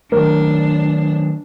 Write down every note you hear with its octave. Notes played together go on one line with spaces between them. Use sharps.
D#3 F#3 A3 D4 A#4